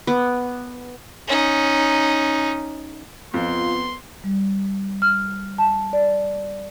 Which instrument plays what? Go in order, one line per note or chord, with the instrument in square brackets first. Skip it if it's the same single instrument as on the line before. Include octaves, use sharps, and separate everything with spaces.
[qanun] B3 B4 D6
[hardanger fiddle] C#4 D#4
[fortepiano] F2 [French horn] B3 [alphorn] F4 [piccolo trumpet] C6
[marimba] G3
F6
A5
D5